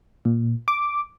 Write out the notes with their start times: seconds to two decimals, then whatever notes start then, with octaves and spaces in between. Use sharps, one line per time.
0.25 A#2
0.68 D6